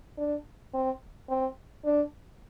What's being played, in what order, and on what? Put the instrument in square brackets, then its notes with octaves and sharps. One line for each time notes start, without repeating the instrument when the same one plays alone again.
[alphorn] D4
C4
C4
D4